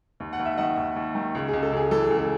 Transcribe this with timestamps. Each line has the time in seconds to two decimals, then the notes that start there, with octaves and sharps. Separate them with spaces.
0.20 D#2
0.33 F#5
0.39 D#2
0.45 E5
0.57 D#3 D#5 F#5
0.77 D#2
0.96 D#2
1.15 D#3
1.35 C#2
1.48 C#2 G#4
1.63 A4
1.72 C#2 G#4
1.91 E3 A4
2.04 G#4
2.10 C#2
2.18 A4